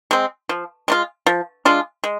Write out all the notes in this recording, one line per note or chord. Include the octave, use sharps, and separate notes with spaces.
G#3 C4
F3
G#3 D4 F4
F3
G#3 D4 F4
G#3